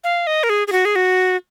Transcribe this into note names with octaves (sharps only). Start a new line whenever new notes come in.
F5
D#5
A#4
G#4
G#4
F#4
G#4
F#4